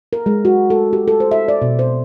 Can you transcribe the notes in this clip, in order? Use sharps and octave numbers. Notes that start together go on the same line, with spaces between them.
A#4
G#3
F#4
A4
G4
A4
C5
E5
D5
B2
C5